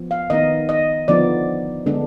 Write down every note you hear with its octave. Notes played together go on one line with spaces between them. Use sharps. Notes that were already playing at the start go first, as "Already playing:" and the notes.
Already playing: F3 B3
F5
D#3 B3 D#4 D#5
D#5
D3 F3 B3 D#4 D5
D3 G#3 B3 D4